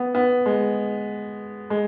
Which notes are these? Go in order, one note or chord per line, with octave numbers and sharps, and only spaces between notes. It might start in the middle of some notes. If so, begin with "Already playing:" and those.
Already playing: B3
B3
G#3
G#3